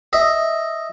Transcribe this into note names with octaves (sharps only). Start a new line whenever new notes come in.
D#5 E5